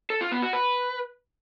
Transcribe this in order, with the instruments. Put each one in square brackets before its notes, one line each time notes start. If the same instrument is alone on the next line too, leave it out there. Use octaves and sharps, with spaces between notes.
[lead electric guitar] A4
F4
B3
F#4
B4